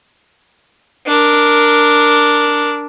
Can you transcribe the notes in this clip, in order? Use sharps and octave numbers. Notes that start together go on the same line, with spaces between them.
D4 A#4